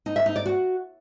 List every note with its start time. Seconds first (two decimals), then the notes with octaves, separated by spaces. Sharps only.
0.06 D#4
0.16 E5
0.26 D#4
0.36 D5
0.46 F#4